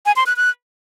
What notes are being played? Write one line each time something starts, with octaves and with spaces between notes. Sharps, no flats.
G#5
C6
F#6
F#6